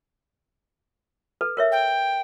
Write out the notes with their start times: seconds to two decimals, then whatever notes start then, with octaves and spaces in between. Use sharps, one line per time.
1.41 A4 B4
1.57 A#4 C#5 E5
1.72 G5